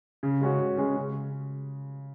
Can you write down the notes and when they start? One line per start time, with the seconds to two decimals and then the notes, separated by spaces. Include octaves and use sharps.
0.23 C#3
0.41 G#3 C#4 F#4
0.59 C#3
0.77 G#3 C#4 F#4
0.96 C#3